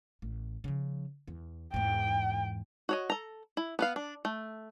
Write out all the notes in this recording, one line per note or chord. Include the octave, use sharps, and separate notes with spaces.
A1
C#3 F3
E2
E2 G#2 G5
F#4 C#5 D#5
A4 A#5
E4
B3 B4 F5
D4
A3